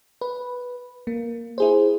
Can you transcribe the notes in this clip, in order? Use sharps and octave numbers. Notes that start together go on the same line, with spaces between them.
B4
A#3
E4 G#4 C5